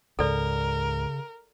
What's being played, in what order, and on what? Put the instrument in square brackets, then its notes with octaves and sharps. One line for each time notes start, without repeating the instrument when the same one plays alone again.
[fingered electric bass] C#2 G#2 [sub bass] C#3 [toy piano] A4 D5 [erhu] A#4